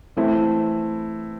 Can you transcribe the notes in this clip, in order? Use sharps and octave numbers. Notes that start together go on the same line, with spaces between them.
E3 A3 C4 E4